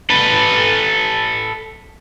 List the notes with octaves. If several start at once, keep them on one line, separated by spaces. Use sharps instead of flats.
A4 B4